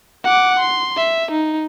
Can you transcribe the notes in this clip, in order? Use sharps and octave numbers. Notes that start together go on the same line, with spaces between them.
F#5 D6
C6
E5
D#4